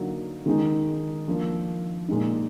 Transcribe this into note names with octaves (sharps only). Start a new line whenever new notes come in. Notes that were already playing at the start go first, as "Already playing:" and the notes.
Already playing: D3 F#3 A#3 D#4
D#3 G#3 D#4
F3 A#3 D4
A#2 G#3 D#4